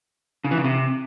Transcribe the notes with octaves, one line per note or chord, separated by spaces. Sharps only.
C#3
E3
C#3
C3